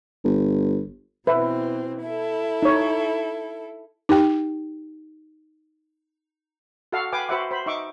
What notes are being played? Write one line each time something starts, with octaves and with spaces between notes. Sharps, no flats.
G1
B2 E3 C4 B4 E5
E4 A4
D#4 C#5
D#4 G4 G5
F#4 A4 D5 F5 F#5
B4 F5 G5 G#5 D6
F#4 B4 C5 E5 F#5 D6
C5 B5
D#4 E5 C#6 D6